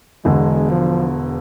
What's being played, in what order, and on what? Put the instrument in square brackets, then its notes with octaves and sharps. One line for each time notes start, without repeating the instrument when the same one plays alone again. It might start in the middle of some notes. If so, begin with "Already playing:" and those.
[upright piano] E1 E2 D3 [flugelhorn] G#3
[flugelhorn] F3